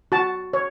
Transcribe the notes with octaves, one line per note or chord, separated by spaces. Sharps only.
F#4 A5
C#5